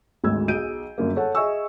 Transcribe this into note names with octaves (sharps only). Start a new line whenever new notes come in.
G#1 D2 G#2 E6 G#6
B1 G#4 G6 D7 D#7
G1 F#2 A#3
A4 C#5 F#5 A5
G#4 D#5 E5 G#5 C#6 E6